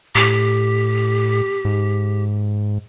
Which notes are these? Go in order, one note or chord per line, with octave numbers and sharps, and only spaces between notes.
A2 G4
G#2